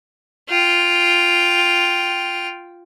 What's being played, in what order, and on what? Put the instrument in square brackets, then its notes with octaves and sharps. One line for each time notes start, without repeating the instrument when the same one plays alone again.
[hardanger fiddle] F4 G5